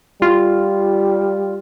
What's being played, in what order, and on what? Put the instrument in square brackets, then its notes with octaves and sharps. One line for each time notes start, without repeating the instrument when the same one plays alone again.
[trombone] G3 [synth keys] F4